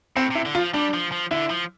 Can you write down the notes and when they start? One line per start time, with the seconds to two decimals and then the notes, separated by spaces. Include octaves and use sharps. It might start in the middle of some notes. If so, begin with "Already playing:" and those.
0.16 A2 C4
0.31 C3 E4
0.45 D3
0.55 F4
0.59 F3
0.74 G3 D4
0.94 F3
1.12 F3
1.31 D3 E4
1.50 F3